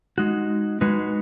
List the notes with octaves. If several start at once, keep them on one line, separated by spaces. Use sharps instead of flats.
G#3 D#4 F#4
G#3 D#4 F#4 B4